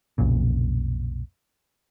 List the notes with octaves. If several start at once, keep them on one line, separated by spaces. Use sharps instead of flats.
B1 F2 A#2 C#3